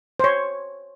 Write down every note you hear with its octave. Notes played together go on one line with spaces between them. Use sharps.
C5 C#5